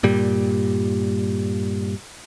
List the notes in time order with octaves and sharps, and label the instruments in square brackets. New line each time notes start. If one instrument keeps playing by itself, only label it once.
[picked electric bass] G2 A#2 G3